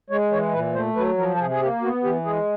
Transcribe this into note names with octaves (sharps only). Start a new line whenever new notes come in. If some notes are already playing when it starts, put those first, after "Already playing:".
G#3 C#5
E3 C#5
A#2 B4
A3 C5
F#3 B4
F3 A#4
A4
C3 G#4
G#4
A#3 G4
B3 F#4
E3 G4
G#3 G#4